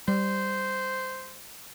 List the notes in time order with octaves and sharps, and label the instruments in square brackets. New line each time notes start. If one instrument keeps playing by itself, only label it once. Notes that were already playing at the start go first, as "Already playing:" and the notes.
[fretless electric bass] G3 [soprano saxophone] C5